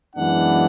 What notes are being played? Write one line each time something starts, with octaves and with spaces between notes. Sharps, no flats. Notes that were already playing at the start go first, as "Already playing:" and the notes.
F#2 E3 G#3 B3 D4 F#5